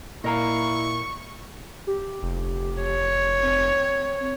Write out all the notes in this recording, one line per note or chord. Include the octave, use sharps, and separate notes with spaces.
A#2 E4 A#4 D#5 F5 A#5 C#6
G4
F1
C#5
C4